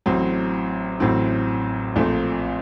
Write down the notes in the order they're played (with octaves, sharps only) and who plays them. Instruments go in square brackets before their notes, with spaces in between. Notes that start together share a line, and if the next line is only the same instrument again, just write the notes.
[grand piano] A1 A2 F#3 C4
A1 A2 F#3 C4
A#1 A#2 A3 C4